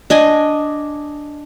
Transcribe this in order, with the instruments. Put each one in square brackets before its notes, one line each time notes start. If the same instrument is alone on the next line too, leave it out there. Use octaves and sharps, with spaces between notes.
[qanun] D4 D#5 G#5